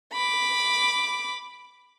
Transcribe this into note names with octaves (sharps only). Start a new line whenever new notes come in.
B5 D6